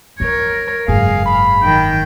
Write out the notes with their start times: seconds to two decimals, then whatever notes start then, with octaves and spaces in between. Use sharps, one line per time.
0.20 E3 F3 A#4 C#5
0.88 F#1 G#2 G#4 F5
1.26 B5
1.63 D#3 G5